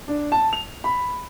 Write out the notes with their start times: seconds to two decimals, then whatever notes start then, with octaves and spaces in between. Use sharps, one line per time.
0.08 D4
0.32 A5
0.53 F7
0.84 B5